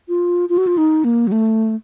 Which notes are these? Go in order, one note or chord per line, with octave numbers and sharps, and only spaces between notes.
F4
F4
F#4
F4
D#4
A#3
F#3
A3